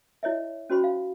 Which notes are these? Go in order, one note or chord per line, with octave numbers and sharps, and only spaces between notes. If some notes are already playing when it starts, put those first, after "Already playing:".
E4 C#5 D#5 E5
C#4 F#4 C5 B5 C#6
F5